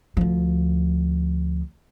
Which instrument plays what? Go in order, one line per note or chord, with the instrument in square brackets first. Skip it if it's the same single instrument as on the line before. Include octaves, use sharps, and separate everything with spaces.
[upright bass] D2 F3